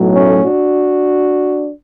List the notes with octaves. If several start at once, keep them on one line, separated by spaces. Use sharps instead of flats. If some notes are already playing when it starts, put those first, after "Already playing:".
Already playing: B1 A2 F#3
A3 C#4
D4 F#4